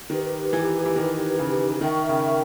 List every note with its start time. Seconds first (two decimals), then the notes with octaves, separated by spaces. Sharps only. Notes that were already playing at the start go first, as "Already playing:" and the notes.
0.10 D#3 D#4 G4 B4
0.53 E3
0.86 E3
0.96 D#3
1.39 C#3
1.81 D#3 A#4 E5 G5 C#6
2.09 C#3